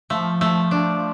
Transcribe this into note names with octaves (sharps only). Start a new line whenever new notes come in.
F3 A3
A3
D4